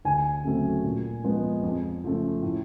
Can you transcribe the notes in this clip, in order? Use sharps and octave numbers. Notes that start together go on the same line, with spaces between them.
D2 G#5
C#3 F#3 A3 C4
A#2
F3 G#3 B3
F2
C#3 F3 A3
A2